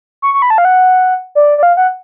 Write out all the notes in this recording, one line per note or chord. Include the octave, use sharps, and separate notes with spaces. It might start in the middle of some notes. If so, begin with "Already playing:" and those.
C#6
C#6
B5
A5
F5
F#5
D5
D5
F5
F#5